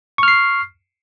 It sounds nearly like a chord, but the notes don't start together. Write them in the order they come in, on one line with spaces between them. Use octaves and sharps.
C#6 F6 C7